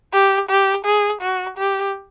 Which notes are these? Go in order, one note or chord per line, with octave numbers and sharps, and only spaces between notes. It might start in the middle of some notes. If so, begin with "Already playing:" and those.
G4
G4
G#4
F#4
G4